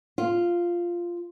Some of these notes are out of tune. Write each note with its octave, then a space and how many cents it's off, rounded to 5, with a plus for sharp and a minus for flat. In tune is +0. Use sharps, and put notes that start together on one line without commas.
F4 -5